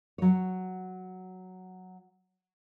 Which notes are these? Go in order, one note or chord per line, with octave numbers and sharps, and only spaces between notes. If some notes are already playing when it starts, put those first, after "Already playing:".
F#3 C#5